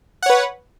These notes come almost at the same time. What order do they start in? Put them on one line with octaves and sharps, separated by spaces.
F#5 C#5 B4